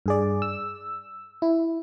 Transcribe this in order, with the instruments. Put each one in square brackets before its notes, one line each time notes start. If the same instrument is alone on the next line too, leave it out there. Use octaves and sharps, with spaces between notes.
[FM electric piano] G2 G#4 D5
E6
E4